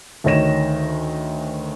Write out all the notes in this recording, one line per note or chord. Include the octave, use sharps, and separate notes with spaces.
D2 D#3 C#5 A#6 E7